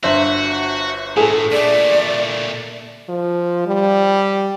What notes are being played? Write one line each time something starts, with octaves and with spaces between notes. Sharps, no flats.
G1 F#4 C5 E5
A2 G#4 A4
A#2 A3 D5
F3
G3